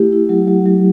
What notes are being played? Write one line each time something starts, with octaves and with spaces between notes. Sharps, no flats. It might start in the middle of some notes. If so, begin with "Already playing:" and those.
Already playing: A3 E4 G4
E4
F#3
F#3
F#3